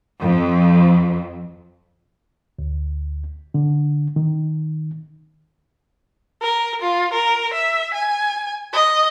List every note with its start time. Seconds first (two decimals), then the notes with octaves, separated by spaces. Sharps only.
0.21 F2
2.59 D2
3.54 D3
4.16 D#3
6.42 A#4
6.82 F4
7.13 A#4
7.54 E5
7.94 G#5
8.73 D#5